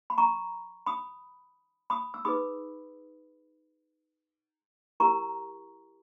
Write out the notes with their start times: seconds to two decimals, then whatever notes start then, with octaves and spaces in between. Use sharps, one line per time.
0.10 B5
0.18 A#5 C#6
0.86 B5 D#6
1.90 B5 D#6
2.14 E6
2.25 D#4 G#4 B4 B5 D#6
5.00 E4 G4 A#4 A#5 C#6